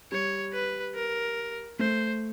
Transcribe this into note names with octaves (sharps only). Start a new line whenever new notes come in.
G3 C#5
B4
A#4
A3 C5